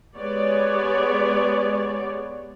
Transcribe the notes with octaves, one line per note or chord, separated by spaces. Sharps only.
G#3 B3 G4 C#5 D5